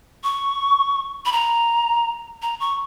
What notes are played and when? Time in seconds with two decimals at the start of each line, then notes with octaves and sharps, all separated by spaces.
0.24 C#6
1.25 B5
1.32 A#5
2.42 A#5
2.60 C#6